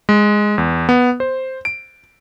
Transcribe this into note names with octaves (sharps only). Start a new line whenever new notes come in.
G#3
E2
B3
C5
D7